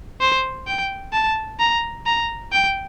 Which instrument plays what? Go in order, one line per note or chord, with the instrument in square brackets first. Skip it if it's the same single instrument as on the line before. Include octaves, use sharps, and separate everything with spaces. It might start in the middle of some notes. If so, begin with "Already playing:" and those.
[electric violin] C5
G5
A5
A#5
A#5
G5